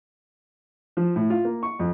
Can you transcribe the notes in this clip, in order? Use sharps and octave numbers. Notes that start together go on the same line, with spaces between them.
F3
A2
F4
A#3
C#6
F2